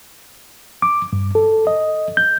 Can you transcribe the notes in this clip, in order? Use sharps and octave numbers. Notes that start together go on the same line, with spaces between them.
D6
G2
A4
D#5
G6